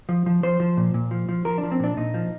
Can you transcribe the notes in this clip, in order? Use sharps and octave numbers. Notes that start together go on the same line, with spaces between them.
F3
F3
F3 C5
F3
A#2
A#2
F3
F3
F3 A#4
D4
F3
C4
A#2 D4
A#2 D#4
F3